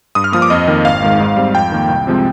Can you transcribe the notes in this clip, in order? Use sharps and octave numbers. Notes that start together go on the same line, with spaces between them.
G2 D#6
F6
F3 A#3 D#6
D6
F2 D#5
D#3 A#3
G#1 F5
G#2 D#3 G#3
G#2
G3 C4
F2 G5
D#3 A#3
C2
C3 F3 G#3 C4